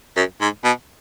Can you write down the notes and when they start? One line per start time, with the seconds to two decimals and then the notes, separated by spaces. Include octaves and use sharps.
0.16 F#2
0.41 G#2
0.64 B2